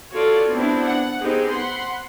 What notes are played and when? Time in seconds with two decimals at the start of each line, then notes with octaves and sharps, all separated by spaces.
0.12 F4 F#4 A4 C#5 D5
0.52 B3 C4 D4 E4
0.84 F#5
1.22 B3 C4 D#4 G4 G#4
1.50 F#5 B5 C6